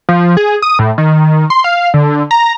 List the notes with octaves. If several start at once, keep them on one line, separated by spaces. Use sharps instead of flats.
F3
G#4
D#6
A2
D#3
C6
F5
D3
A#5